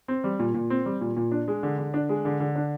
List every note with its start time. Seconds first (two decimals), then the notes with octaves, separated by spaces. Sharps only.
0.08 C4
0.24 G3
0.39 A#2
0.54 A#2
0.70 C4
0.86 G3
1.01 A#2
1.17 A#2
1.32 D4
1.48 G#3
1.63 D3
1.78 D3
1.94 D4
2.09 G#3
2.25 D3
2.40 D3
2.55 D4